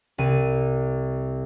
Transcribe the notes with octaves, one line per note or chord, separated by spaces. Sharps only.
C2 D#7